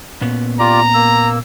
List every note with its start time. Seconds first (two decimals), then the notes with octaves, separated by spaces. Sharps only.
0.21 A#2 B3 C#4
0.59 F4 G4 D5 A#5
0.94 A#3 E6